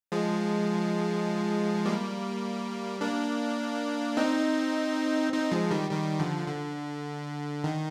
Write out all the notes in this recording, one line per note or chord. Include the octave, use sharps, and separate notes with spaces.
F3 G#3
G3 A#3
A#3 D4
C4 D#4
C4 D#4
F3 G#3
D#3 G3
D#3 G3
D3 F3
D3
D#3